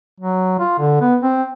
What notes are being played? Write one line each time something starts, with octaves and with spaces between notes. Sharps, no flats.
F#3
F4
D3
B3
C4